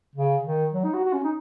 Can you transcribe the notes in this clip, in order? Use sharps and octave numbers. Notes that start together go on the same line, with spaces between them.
C#3
D#3
F#3
D#4
F#4
F#4
C#4
D#4